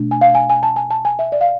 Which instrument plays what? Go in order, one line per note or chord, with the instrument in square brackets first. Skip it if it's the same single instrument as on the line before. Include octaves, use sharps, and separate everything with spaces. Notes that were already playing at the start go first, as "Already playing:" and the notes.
Already playing: [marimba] B2 A3 D4
G#5
F5
G#5
G#5
A5
G#5
A5
G#5
E5
D5
F5